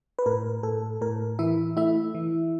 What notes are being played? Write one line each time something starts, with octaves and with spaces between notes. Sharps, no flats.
B4
A2 A#4
A2 A4
A2 A#4
E3 E4 E5
A3 E4 E5
E3